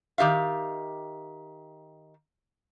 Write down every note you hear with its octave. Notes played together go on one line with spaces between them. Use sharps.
D#3 G4 E5 F5